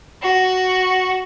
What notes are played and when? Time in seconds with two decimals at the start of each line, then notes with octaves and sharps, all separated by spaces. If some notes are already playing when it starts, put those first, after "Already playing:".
0.22 F#4